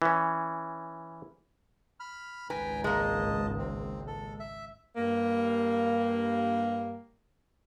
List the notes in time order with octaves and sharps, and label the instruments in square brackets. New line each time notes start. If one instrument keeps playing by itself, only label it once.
[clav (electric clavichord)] E3 C#4
[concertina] B5 F6
[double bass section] G#1 C#2 [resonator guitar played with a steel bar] B4 [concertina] G5 G#5 A#5
[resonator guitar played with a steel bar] G#3 A#3 [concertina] D#5 A5
[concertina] C4
A4
E5
[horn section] G2 A#3